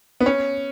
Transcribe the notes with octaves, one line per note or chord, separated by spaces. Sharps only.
B3
C#4